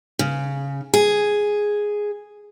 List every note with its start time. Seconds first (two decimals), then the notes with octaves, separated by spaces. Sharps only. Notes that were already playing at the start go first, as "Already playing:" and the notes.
0.19 C#3
0.94 G#4